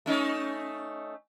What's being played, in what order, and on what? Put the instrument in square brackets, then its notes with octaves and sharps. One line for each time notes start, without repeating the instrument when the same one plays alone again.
[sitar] A3 C#4 D#4